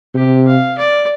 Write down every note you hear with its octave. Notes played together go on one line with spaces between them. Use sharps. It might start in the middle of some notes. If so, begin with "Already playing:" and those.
C3 G4
F5
D5